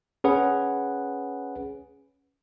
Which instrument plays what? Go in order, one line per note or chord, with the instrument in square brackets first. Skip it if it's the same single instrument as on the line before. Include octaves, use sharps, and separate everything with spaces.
[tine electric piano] C#4 G#4 B4 F#5